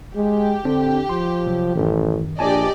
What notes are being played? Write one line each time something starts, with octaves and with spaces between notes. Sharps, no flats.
G#3 G4
D3 C4 D4
F3 C6
C3 F#3
A1 F#2 D#3
A#1 D4 G4 D5 D#5 G#5 A5